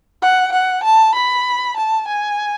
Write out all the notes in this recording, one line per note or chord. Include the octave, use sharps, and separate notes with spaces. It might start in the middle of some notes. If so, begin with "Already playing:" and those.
F#5
F#5
A5
B5
A5
G#5